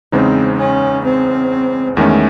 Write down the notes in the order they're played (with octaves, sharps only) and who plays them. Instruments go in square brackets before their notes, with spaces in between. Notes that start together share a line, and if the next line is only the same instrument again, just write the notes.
[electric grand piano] E2 C#3 G#3 D#4 [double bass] C4
[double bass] C#4
C4
[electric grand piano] E2 D#3 G#3 C#4 [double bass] A3